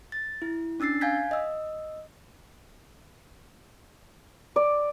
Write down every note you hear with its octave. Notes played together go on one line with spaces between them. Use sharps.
A6
E4
C#4 D4 E6 A6 C7
F5 F#5 G#5 G6 G#6 B6
D#5 E6
D5